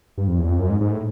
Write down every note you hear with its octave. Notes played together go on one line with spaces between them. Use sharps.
G2
F2
E2
F2
F#2
G#2
G#2
A2